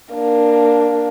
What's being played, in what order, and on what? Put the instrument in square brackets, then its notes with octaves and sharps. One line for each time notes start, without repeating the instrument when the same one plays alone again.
[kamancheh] A#3 D4